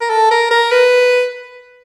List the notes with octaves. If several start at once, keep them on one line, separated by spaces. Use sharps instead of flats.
A#4
A4
A#4
A#4
B4